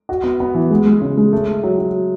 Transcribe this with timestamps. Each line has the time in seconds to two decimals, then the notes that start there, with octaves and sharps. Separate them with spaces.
0.09 F#4
0.24 B3
0.40 B3
0.55 E3
0.71 G#3
0.85 G#3
1.02 C#3
1.17 G#3
1.32 A3
1.48 A3
1.63 F#3
1.79 F#3